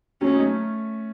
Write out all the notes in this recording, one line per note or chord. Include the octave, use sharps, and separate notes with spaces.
F#3 A3 C#4
D#4
A3 C#4